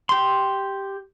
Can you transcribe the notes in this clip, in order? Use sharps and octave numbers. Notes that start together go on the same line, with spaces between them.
G4 C6